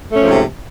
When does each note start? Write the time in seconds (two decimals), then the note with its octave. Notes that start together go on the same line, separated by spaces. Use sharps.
0.12 A3
0.16 C#4
0.20 F3
0.24 G#2
0.28 C3